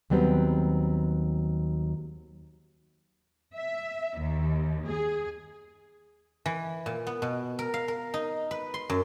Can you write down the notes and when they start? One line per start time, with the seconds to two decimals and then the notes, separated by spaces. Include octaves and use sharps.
0.10 D#2 F#3 G3 B3 C4
3.55 E5
4.19 D#2
4.87 G#4
6.46 E3
6.86 A#2
7.07 B3
7.22 B2
7.59 A#4
7.74 F5
7.88 A#4
8.14 D#4
8.51 B4
8.74 C6
8.90 F#2